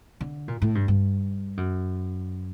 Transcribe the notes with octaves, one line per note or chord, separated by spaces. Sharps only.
D3
A#2
A2
G2
G2
F#2